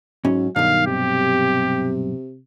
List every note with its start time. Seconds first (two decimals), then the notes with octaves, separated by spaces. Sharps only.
0.25 G#2 F#3 C#4
0.56 B1 G2 D#3 F5
0.87 C3 G4